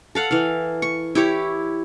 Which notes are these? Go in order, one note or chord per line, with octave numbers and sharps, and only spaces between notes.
A4 F5 F#5
E3 F5
C#6
E4 G4 C#5